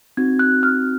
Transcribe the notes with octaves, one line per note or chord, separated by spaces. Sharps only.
C4 D#4 F#4 G#6
F#6
F6